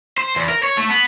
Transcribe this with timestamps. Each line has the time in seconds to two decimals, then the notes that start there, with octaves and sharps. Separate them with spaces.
0.18 C5
0.36 E2
0.49 A#4
0.64 C#5
0.78 A3
0.90 B3